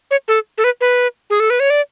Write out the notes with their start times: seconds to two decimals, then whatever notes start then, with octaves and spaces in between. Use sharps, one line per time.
0.11 C#5
0.28 A4
0.58 A4
0.64 B4
0.81 B4
1.30 G#4
1.40 A4
1.50 B4
1.60 C#5
1.70 D5